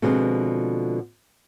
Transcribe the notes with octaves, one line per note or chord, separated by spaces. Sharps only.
B2 D3 F3 G#3 C4